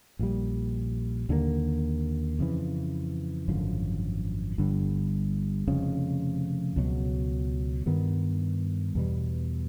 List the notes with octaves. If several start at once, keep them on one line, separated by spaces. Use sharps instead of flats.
A#1 A#2 G3
D#2 D3 F#3 A#3
F2 C#3 E3
G#1 F#2 D3 F3
G1 G2 D3 G3
F1 F2 C#3
C#2 B2 F#3
G2 D#3 G3 B3
E2 B2 G3